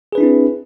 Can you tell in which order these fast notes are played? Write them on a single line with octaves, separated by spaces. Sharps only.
G#4 B4 D4 E4 C4